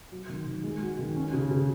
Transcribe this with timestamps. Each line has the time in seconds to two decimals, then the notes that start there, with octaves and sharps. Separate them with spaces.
0.12 F#3
0.29 D#3
0.46 D#3
0.64 G#3
0.82 F#4
0.99 D#3
1.16 C#4
1.33 C#3
1.51 C#3